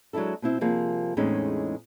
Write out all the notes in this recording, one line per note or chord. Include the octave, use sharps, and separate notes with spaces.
F#3 G#3 D4 E4 A4
B2 C4 E4
C3 F3 G3 A#3 G#4
E2 A2 G#3 C4 C#4 D#4